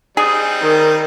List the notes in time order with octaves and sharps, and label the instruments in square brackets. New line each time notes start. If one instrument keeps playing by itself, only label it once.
[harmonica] G3 C4 D#4 [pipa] G#4
[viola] D#3